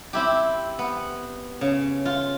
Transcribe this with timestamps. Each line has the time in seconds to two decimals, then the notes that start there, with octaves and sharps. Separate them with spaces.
0.13 C4 E4 G4
0.79 B3
1.61 C#3
2.05 F4